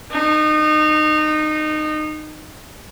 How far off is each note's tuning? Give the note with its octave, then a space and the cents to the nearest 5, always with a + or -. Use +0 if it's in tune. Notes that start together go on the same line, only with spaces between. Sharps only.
D#4 -25